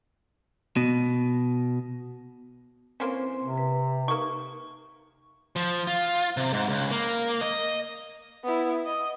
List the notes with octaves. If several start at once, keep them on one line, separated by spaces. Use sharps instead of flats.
B2
E3 A#3 C4 C#4 C5 C6
C3
B4
A#3 D#4 C#6
F3
F4
C3
G#2
C#2
A#3
D#5
B3 E4
D#5